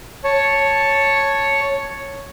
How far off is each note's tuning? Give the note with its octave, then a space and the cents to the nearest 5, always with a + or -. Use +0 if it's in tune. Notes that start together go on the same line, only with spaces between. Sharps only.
C#5 +0 A5 +0